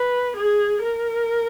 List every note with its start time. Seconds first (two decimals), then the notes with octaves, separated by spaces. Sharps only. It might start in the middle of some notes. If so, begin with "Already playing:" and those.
Already playing: B4
0.36 G#4
0.82 A#4